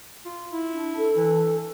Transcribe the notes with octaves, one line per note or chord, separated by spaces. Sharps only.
F4
E4
D4
A4
E3